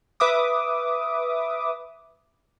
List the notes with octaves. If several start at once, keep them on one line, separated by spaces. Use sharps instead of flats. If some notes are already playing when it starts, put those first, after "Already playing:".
B4 E5 D6 D#6